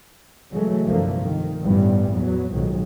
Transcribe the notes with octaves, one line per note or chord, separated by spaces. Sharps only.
C#3 E3 F#3 G#3 A3
C2 G2 D3 F3 A3 A#3
D#3
A1 G2 E3 G3 B3
E2 F#3 B3
B1 G#2 D#3 F3 F#3